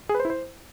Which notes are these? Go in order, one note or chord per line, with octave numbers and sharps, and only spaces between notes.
G#4
B4
C5
E4
C5